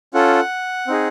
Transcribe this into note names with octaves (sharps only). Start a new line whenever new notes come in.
C#4 F4 A4 F#5
C4 D#4 G#4